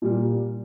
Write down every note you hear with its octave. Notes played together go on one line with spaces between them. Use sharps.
A#2 G3 A#3